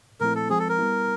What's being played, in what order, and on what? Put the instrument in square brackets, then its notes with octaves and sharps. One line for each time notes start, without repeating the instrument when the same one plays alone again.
[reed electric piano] A#2 F3 A3 C4 E4 [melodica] A#4
[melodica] A4
[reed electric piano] F3 G#3 C4 [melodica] G#4
[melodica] A4
A#4
[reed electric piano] G3 B3 E4